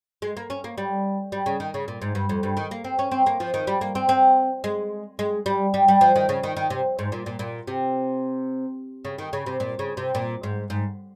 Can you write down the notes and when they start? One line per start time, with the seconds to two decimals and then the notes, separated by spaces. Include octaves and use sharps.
0.22 G#3
0.37 A#3
0.50 C#4
0.64 A#3
0.78 G3
1.32 G3
1.46 C#3
1.60 D#3
1.74 C#3
1.88 A#2
2.02 G#2
2.15 G2
2.29 F2
2.43 G2
2.57 D#3
2.71 A#3
2.84 C4
2.99 C#4
3.11 C4
3.26 A#3
3.40 F3
3.54 D#3
3.67 G3
3.81 A#3
3.95 C4
4.09 C4
4.64 G#3
5.19 G#3
5.46 G3
5.74 G3
5.88 G3
6.01 F3
6.16 D#3
6.29 C#3
6.43 D#3
6.57 D#3
6.70 C3
6.99 G#2
7.12 A#2
7.26 A#2
7.39 A#2
7.67 C3
9.05 C#3
9.18 D#3
9.33 C#3
9.46 C3
9.60 A#2
9.79 C#3
9.97 C3
10.15 A#2
10.43 G#2
10.70 G#2